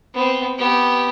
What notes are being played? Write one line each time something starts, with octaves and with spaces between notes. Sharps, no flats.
B3 C4
B3 G4